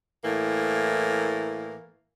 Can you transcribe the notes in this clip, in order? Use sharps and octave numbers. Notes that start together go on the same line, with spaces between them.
A2 E3 A#3